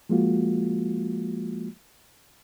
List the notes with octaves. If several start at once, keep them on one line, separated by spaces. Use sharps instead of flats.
F3 G#3 A#3 F4 F#4